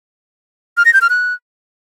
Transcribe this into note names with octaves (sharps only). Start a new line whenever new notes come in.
F6
A#6
G6
F6
F#6